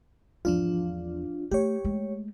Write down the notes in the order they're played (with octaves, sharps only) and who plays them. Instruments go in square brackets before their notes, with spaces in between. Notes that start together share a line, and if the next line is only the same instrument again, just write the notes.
[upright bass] G#1 E2 [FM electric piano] F3 D4 F4
[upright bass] A3 [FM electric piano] G4 C#5
[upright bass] G#3 A3